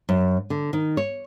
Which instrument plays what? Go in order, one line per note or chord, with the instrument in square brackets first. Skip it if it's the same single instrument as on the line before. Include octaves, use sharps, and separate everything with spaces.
[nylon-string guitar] F#2
D3
D#3
C#5